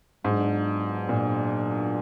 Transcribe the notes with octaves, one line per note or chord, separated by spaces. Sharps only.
G#2 F#3 B3 D4 F4
A#2